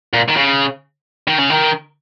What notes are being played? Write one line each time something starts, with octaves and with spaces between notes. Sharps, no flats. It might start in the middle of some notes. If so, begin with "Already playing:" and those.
A#2
D#3
C#3
D#3
C#3
D#3